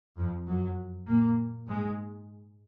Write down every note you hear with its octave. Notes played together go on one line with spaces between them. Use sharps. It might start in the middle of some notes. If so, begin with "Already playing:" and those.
F2 F3
F#2 F#3
A#2 A#3
G#2 G#3